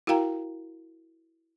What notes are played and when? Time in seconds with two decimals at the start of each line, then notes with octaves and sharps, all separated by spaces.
0.07 E4 F#4 A#4 F5 G5 A#5